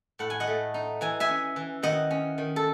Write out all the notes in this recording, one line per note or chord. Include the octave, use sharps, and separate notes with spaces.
A2 F#5
G#5
D#5 F#5
A3
D#4
E3 G#5
E5 G#5
C#4
E3
D#3 D#5 F#5
C#4
D#3
A4